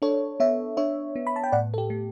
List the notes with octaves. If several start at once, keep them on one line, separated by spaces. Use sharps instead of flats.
D4 A4 C#5
B3 C#5 E5
D4 C#5 E5
B3
B5
A5
G5
A2 D5 F#5
A4
G4
A3